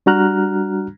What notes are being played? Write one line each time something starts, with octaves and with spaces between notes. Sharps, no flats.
G3 D4 F#4 A#5 F6 F#6